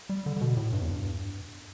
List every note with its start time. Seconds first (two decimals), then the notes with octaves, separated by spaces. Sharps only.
0.09 G3
0.26 D3
0.36 D3
0.41 B2
0.57 A2
0.73 G2
0.82 E2
0.91 G2